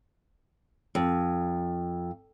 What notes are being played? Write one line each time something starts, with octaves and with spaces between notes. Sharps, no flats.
F2